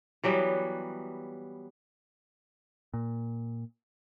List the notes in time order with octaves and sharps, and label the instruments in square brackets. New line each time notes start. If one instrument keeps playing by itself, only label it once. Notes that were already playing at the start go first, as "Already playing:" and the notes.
[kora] E3 F#3 G3 B3
[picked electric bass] A#2